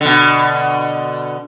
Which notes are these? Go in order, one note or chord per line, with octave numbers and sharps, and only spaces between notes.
B2 D3